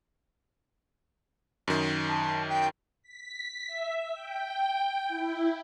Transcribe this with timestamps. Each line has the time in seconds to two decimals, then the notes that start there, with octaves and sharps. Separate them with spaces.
1.68 F#2 D#3
2.08 A5
2.49 G5
3.03 B6
3.67 E5
4.14 G5
5.08 E4